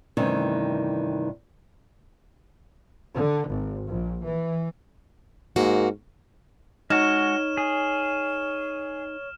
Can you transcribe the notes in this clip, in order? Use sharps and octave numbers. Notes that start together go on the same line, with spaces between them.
G2 C3 D#3 E3 A3 C#4
D3
G#1
A#1
E3
G#2 A#3 F#4
G#3 D#4 F#4 C#5 F6 E7
G#4